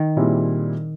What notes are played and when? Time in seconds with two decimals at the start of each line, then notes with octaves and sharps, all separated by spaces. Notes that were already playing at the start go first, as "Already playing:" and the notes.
Already playing: D#3
0.17 A#2 G3 C4 E4 G#4